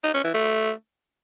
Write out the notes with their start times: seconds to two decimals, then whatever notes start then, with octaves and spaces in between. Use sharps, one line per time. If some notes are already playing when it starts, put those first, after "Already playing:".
0.04 D#4
0.14 C#4
0.24 E3
0.34 A3